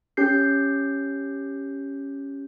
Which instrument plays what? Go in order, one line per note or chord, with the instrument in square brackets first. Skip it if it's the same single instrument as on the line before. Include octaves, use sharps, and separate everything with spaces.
[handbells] C#4 G4 G6 C7